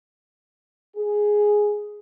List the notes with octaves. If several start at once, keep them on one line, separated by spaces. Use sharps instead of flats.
G#4